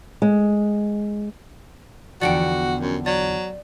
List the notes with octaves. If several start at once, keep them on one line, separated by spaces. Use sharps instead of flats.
G#3
E2 D3 F3 F#4 D5 F#5 G5
F#2
F#3 D5